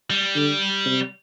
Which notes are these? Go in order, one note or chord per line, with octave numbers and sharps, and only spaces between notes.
G3
D3
C3